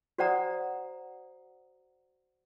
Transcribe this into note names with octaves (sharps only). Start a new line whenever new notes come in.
F#4 C5 D5 F#5 A#5 D#6